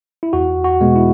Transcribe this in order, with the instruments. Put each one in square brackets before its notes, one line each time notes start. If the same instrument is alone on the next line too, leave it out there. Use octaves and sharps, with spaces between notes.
[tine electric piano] E4
E2 F#4
F#4
B2 G#3 B3
E4